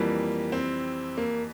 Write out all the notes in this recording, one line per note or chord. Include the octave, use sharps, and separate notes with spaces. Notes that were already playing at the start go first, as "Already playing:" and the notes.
Already playing: F2 E3 G3 A#3
C4
A#3